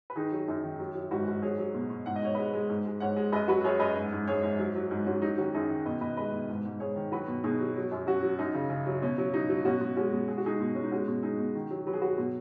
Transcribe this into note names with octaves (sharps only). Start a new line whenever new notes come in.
B4
D#3 D#4 G#4
F#3
F#2 D#4 G#4
D#3
F#3
F#3
G#2 F#4 B4
G#2
F#3 G#4 C#5
F#3
B2
B2
G#2 F#5
D#5
G#2 C#5
G#3 B4 D#5
G#3
G#2
G#3
G#2 C#5 F#5
G#3
F#2 B4 D#5
F#3 F#4 B4
F#2 G#4 C#5
F#2 B4 D#5
G#2
G#2
G#2 G#4 C#5
G#2
F#3
F#3
G#2
G#2 C#4 F#4
F#3 D#4
D#3 C#4 F#4
F#2 D#4 G#4
D#3
B2 B4 D#5
B2 B4 D#5
G#3 B4 D#5
B2
G#2
G#2
G#2 G#4 C#5
D#3
F#3 F#4 B4
B2
B2 D#4 G#4
F#3
F#3
F#2
F#3 C#4 F#4
F#3
F#2 D#4
C#3
C#3
F#3
B2 C#4
F#3
F#3 D#4
F#3
B2 C#4 F#4
B2
G#3 C#4 F#4
B2
G#3 G#4
F#4
G#3 D#4 G#4
B2
G#3 C#4
D#4
G#3 C#4 F#4
B2
G#3 D#4 G#4
B2
D#3
F#3
F#3 B4
G#4
F#3 F#4 B4
B2